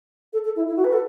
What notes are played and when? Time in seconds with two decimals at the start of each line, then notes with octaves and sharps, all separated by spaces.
0.33 A4
0.45 A4
0.56 E4
0.68 E4
0.77 F#4
0.84 B4
0.93 A4